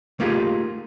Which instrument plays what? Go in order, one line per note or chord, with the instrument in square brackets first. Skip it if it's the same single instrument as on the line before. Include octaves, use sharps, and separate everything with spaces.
[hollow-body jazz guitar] A3 A#3 D#4 F4 G4 G#4